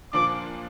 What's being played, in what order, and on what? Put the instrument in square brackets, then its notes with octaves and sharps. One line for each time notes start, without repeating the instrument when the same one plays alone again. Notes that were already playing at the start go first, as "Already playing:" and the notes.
[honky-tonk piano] A#2 F3 A#3 D4 [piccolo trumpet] D6